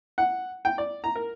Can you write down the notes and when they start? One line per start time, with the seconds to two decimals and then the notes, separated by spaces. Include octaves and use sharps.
0.18 F#5
0.65 G5
0.78 D5
1.04 A#5
1.16 A#4